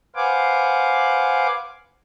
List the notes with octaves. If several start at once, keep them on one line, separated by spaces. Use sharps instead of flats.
B4 C5 F5 F#5 G#5 D6